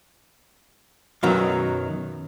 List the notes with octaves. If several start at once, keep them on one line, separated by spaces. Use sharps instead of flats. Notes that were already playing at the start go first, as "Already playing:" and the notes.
F#2 B2 D#3 F#3